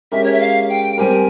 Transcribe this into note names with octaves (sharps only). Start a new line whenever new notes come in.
G#3 C#4 G4 A#4 E5
C#5
E5
F5
G5
G3 C4 G4 A#4 G#5